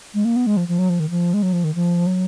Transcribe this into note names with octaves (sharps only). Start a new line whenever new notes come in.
G#3
A#3
B3
G#3
F3
F3
F#3
F3
D#3
F3
G#3
F#3
F3
D#3
F3
F#3